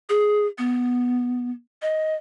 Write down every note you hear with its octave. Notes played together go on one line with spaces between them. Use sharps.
G#4
B3
D#5